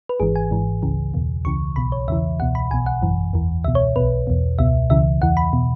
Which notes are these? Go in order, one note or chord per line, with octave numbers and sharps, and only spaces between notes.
B4
G#1 G#2 E3 G#4
G#5
G#1 G#2 E3
C#2 C#3 E3
E2 B2
C#2 C#3 E3 C#6
B1 B2 B5
C#5
E2 C#3 E3 E5
C#2 B2 F#5
B5
B1 B2 G#5
F#5
G#1 F#2 E3
E2 E3
C#2 B2 E5
C#5
B1 B2 B4
E2 B2
C#2 B2 E5
C#2 C#3 E3 E5
E2 E3 F#5
B5
B2